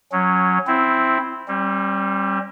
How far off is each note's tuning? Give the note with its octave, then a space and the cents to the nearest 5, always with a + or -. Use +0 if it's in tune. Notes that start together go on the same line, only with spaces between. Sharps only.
F#3 -15 C#4 +0
C4 +0 E4 +0
G3 +0 C#4 -45